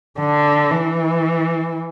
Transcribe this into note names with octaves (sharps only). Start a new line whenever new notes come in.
D3
E3